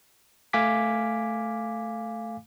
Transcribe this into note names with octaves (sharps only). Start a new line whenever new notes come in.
A3 F5 G#5 D6 B6